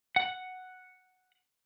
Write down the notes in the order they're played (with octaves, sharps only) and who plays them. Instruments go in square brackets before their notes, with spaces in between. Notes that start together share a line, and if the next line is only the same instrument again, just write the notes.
[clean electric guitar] F#5